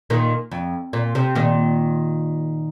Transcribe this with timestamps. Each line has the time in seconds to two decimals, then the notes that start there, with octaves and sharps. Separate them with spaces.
0.10 A#2 D#3
0.52 F2
0.93 A#2
1.15 C3
1.35 A#2 D#3